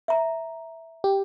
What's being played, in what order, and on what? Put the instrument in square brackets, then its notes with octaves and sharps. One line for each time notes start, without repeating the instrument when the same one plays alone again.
[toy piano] E5 A#5
[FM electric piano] G4